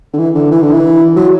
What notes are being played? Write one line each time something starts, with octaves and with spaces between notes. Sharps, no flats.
D3
E3
D3
E3
D3
E3
F#3